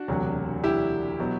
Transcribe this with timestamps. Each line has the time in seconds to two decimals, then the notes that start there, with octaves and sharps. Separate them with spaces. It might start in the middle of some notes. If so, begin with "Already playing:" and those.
Already playing: D4 F#4
0.08 E1 D2 C3 F#3
0.64 E4 G4
1.20 B2 F#3